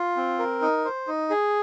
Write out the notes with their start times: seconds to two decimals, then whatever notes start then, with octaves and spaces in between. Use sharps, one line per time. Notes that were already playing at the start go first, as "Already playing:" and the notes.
Already playing: F4
0.17 C4
0.39 A#4
0.61 D#4
0.85 C5
1.07 D#4
1.30 G#4